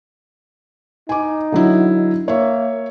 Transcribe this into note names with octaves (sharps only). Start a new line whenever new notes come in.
D#4 G#5 D6
D3 F#3 E4
A#3 C#5 E5